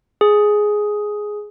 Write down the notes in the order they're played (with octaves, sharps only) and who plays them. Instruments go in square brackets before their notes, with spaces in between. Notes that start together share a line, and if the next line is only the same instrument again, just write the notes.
[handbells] G#4